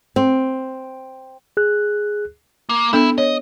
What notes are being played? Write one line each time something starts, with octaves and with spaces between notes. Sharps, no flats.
C4
G#4 F#6
A#3
B3 D4 E4 A4 E5
C#5 D#5